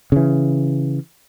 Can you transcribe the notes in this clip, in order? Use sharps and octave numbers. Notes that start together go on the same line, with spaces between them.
C#3 E3